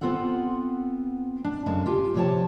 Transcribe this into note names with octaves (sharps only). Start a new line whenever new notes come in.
B3 C4 F4 A4 F#5
D4
F#2 C#3 G#3 A4 A5
F4 G4 G#5
E2 C3 F3 C#5 G5 A5